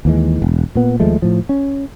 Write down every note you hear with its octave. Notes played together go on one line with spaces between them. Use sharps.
D#2 E3 G#3
E1
A#2 B3
D#2 F3 G#3 A3
A2 F3
C#4